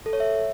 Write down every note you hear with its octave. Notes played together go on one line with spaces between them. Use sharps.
A4
C#5
E5